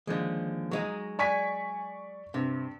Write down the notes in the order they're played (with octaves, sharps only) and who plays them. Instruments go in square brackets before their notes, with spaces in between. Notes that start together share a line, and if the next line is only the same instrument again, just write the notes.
[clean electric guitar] D#2 F3 [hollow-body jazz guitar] D3 G#3
[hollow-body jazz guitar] F#3 G#3 D#4
[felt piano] D5 C#6 B6 [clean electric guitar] G#5
[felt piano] G2 [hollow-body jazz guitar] C3